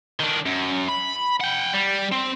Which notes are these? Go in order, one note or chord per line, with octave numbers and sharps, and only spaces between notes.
D#3 D4
F#2
B5
F#5 G5
G3
C4